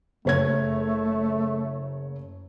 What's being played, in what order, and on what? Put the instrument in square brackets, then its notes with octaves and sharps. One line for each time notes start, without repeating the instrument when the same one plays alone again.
[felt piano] F#1 C#5 G#6 [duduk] A3